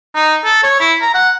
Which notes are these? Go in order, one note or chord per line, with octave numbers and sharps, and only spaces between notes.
D#4
A4
C#5
E4
A#5
F#5